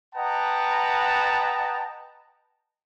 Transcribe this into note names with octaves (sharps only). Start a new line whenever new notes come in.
B4 D#5 F#5 G5 A5 A#5